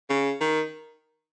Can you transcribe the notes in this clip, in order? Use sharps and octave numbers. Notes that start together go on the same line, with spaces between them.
C#3
D#3